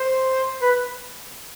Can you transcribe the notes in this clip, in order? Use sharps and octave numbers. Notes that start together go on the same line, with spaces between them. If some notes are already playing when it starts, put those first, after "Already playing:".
Already playing: C5
B4